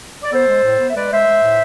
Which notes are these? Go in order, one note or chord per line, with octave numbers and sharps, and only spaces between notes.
D5
B3 A4 C5
G#3
A2
B3
E5
G#3 B4 D5
G#3 C5 E5
G#3
A2